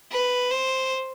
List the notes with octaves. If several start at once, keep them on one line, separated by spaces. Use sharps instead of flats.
B4
C5